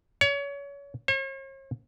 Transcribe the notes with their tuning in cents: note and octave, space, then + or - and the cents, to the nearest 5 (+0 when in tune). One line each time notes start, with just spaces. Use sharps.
C#5 +30
C#5 -45